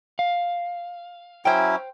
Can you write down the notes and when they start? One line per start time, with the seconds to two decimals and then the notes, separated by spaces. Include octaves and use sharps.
0.19 F5
1.45 F#3 C#4 E4 C5 G5